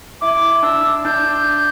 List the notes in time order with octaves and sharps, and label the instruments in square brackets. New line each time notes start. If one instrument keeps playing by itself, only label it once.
[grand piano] E4 [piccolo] D6
[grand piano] D4 [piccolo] E6
[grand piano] D4 [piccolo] G6